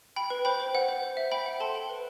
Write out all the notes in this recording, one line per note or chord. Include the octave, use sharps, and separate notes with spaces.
G5 B5
B4
C5 G5 B5
C5
F#5
C5
C5
E5
C5 G5 B5
F#5
A4 A5 C6
G5
B4